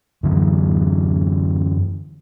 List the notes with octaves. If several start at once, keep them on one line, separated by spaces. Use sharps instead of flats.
F#2 D3 E3 F#3